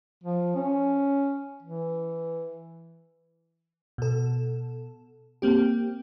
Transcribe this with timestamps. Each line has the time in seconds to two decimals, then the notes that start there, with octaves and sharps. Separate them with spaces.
0.24 F3
0.55 C#4
1.63 E3
3.98 B2 A4
5.42 A#3 C4 G4